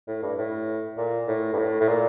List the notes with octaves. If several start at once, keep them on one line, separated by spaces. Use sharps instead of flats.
A2
G2
A2
A#2
A2
G2
A2
A2
A#2